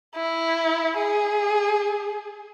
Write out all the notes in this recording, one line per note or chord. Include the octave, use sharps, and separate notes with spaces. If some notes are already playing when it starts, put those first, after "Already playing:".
E4
G#4